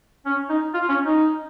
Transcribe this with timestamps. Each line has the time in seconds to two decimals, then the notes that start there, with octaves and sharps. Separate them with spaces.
0.26 C#4
0.50 D#4
0.74 F4
0.89 C#4
1.05 D#4